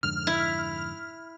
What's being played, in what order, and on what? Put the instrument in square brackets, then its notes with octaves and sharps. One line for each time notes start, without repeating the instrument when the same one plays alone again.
[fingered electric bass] F2 G#2 D3 [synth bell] F6
[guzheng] E4